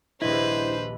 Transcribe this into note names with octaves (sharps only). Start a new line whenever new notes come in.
D#1 A#1 D4 E4 B4 C5 D#5